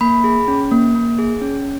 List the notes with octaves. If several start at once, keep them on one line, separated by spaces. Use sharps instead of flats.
A#3 B5
G#4
C#4
A#3
A#3
G#4
C#4